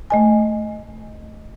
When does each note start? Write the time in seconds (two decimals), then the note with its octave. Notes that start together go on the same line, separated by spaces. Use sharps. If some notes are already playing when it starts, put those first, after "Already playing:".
0.10 A3 D#5 G#5